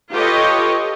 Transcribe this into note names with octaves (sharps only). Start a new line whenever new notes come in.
F4 G4 A4 B4 C#5 D#5